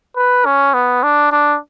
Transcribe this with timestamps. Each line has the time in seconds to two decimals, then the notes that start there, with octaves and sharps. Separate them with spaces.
0.16 B4
0.45 C#4
0.74 B3
1.03 D4
1.32 D4